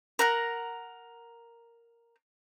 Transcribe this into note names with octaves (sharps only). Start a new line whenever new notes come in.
A#4 F#5 A#5